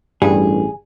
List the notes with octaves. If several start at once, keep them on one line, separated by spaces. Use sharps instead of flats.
A1 G2 G3 G#4